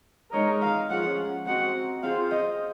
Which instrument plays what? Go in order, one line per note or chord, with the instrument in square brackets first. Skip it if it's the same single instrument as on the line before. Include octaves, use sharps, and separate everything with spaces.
[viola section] G#3 D#4 A#4 D#5 [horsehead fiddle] C#5
[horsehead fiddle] F5
[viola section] F3 G#3 C#4 F4 [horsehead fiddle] F#5
[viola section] C4 D#4 F#4 [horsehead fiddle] F#5
[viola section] C4 F4 G#4 C5 [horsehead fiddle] F5
[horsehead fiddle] D#5